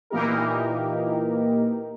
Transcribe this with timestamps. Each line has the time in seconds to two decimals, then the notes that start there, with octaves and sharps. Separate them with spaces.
0.10 A#2 E3 A#3 D#4 G4 A#4